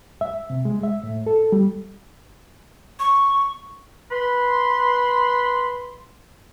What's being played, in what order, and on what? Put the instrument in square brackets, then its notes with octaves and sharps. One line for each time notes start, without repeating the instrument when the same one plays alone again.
[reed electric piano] E5
C3
G#3
E5
A2
A4
G3
[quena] C#6
[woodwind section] B4 B5 C6